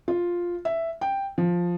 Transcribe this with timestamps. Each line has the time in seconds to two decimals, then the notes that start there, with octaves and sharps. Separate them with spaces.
0.08 F4
0.65 E5
1.01 G5
1.38 F3